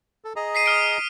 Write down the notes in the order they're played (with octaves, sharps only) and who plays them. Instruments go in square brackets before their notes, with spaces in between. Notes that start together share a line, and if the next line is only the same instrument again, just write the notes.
[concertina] A4
G#4 D#5 A#5
[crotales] B6 C7 D#7
D#6 F6 D7